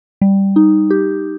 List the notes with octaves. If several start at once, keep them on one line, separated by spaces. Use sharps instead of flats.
G3
D#4
G4